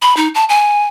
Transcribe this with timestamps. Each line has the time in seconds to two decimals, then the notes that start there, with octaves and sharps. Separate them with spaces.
0.02 B5
0.17 D#4
0.35 A5
0.49 G#5